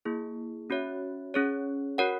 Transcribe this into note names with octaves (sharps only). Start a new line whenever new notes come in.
A#3 E4 G#4
C#4 F#4 C#5 E5
C#4 G#4 C#5
F#4 A#4 C#5 F#5